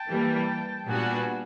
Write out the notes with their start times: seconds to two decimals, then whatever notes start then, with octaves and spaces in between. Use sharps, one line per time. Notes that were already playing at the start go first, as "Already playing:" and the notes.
Already playing: G5 A5
0.10 E3 G3 A#3
0.88 A#2 G3 B3 D4 F#4 F#5 G#5